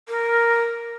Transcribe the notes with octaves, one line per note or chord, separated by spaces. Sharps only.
A#4